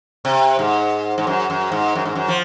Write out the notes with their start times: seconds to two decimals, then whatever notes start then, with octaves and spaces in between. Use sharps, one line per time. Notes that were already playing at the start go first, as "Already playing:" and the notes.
0.25 C3
0.59 G#2
1.18 G#2
1.27 F#2
1.50 F#2
1.72 G#2
1.96 F#2
2.05 G#2
2.15 F#2
2.28 F3